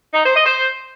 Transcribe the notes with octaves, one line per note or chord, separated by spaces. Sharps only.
D#4
C5
D#5
C5